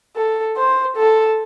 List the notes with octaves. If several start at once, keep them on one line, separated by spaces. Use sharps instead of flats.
A4
C5
A4